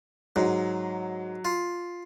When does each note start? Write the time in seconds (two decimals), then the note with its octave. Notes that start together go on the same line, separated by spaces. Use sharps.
0.36 G#2 F#3
1.45 F4